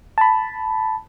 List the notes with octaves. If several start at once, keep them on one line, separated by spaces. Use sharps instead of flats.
A5 B5